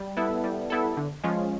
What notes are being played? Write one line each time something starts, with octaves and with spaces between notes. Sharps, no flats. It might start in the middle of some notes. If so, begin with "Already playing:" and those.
Already playing: G3
B3 E4 A4
G3
B3 E4 A4
D3
F3 G#3 C#4 F4